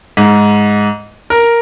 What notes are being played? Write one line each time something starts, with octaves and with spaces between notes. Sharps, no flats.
G#2
A#4